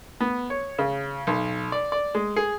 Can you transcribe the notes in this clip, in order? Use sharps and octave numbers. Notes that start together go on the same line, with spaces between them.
B3
C#5
C#3
B1
D5
D5
G#3
G#4